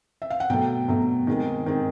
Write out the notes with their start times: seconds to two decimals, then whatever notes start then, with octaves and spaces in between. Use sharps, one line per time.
0.22 E5
0.30 F5
0.40 F#5
0.50 B2 F#3 A3 G5
0.88 B2 F#3 A3
1.27 D#3 G#3 C4
1.66 D#3 G#3 C4